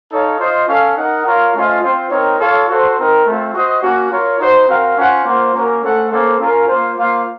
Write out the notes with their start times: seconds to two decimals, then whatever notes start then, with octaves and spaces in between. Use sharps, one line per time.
0.11 D#4 A4 C#5 F5
0.39 F4 C5 D#5
0.68 C#4 A4 C#5 F5
0.97 D#4 A#4 D#5 F#5
1.26 F4 A#4 C#5 F5
1.54 A3 C#4 F4 C5 D#5
1.83 C4 F4 C5
2.11 C4 D#4 A#4 C#5
2.40 F4 A4 C#5 F5
2.68 F#4 A4 C5
2.97 C4 D#4 A#4
3.26 A3 C4 F4
3.54 F#4 C5 D#5
3.83 A#3 C#4 F#4
4.11 F4 A#4 C#5
4.40 D#4 F#4 C5
4.68 C4 F#4 A#4 F5
4.97 C#4 F4 C5 F#5
5.25 A#3 F4 C5 F#5
5.54 A#3 C#4 F#4 A#4
5.83 A3 C#4 A4 C5 F#5
6.11 A#3 C#4 A4 C5
6.40 C#4 F4 A#4 F5
6.68 A#3 F4 C5
6.97 A#3 F4 C5 F5